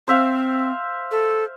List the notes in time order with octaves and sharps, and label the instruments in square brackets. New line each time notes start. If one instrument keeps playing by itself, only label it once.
[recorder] C4 [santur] C5 E5 F5
[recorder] A4